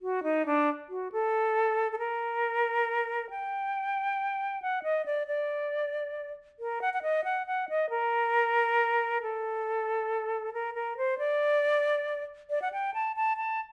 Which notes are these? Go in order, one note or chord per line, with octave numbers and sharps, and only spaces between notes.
F#4
D#4
D4
F#4
A4
A4
A#4
G5
F#5
D#5
D5
D5
A#4
F#5
F#5
D#5
F#5
F#5
D#5
A#4
A4
A#4
A#4
C5
D5
D5
F#5
G5
A5
A5
A5